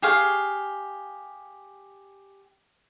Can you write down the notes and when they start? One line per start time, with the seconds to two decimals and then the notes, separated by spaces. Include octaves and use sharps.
0.02 G4 G#4 F5 C#6